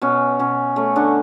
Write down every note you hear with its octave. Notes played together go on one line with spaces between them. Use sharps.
B2 C#4
B2 C#4
A3 C#4
D3 D4